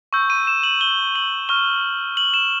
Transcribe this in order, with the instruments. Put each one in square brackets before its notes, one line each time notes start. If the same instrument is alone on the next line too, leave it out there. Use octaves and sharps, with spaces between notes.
[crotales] C#6 E6 G6
D#7
E7
F#7
G7
F#7
C#6 F6 G7
F#7
E7